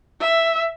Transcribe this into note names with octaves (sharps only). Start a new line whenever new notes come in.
E5